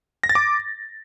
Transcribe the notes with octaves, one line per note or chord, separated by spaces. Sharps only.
A#6
A6
D6